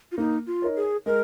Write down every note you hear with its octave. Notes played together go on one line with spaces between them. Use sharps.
F4
A#3 D#4
F4
D#4 A#4 C#5
G#4
G#3 A#4